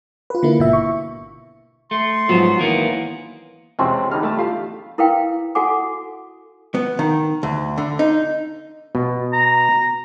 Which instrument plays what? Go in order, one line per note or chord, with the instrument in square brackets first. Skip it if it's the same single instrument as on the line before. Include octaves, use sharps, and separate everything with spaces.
[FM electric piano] F4 B4
D3 A#3 E4
G#1 B2 E5
C#6
[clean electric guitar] A3 [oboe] C6
[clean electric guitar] G#2 B3 [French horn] F3 [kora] F#3 G#4
[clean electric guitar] D#3 A#3 B3 [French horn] E3
[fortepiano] E2 C3 F#4 [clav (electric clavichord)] G#3 C4 C#4
[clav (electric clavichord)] E2 D3 G3 [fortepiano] D#4 F6
[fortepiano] A3 A5
F4 G4 F5
[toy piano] E4 A#4 B4 F5 G5
F#4 A4 F#5 G#5 D6
[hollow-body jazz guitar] B3
D#3
D2
D3
D#4
[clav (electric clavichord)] B2
[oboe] A#5